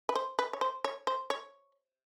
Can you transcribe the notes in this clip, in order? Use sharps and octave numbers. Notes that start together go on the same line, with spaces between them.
B4
C5
B4
C#5
C5
C#5
C5
C#5